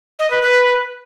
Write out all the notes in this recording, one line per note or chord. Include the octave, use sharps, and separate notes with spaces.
D#5
B4
B4